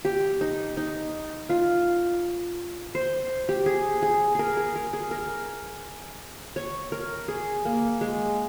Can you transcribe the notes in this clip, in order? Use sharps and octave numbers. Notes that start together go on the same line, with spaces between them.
G4
D#4
D#4
F4
C5
G4
G#4
G#4
G#4 A#4
G#4
A#4
G#4
A#4
C#5
A#4
G#4
A#3
G#3